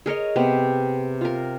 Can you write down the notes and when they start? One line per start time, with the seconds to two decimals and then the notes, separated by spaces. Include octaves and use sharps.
0.06 G#4 A#4 C#5 D#5
0.36 C3 B3
1.21 F4 A#4